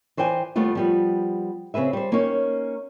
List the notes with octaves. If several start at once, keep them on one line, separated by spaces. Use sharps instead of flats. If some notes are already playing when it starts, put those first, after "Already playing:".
E3 C5 D5 G5 G#5
D#2 G3 A3 B3 F4
F3 G3 B3
C#3 C4 G#4 B4 E5
G3 C5
A#3 C#4 D#4 C#5